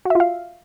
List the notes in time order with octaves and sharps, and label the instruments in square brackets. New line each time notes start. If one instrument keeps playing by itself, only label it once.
[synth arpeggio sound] F#4
E5
F4
F5